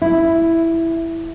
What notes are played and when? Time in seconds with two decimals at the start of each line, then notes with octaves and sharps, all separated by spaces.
0.02 E4